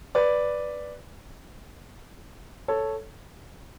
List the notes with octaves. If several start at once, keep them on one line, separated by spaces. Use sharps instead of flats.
B4 D5
A4 C#5